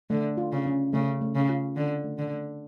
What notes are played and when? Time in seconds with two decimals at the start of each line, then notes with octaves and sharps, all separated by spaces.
0.10 D3 A3
0.37 F4
0.52 C#3
0.66 C#4
0.93 C#3 A3
1.21 A3
1.35 C#3
1.50 F4
1.77 D3 C#4
2.04 A3
2.19 D3
2.33 A3